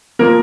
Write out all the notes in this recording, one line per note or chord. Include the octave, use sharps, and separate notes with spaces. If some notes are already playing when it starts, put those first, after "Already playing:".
F3 A#3 A#4